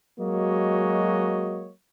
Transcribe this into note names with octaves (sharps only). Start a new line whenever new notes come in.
F#3 G#3 A#3 F#4 C#5 D#5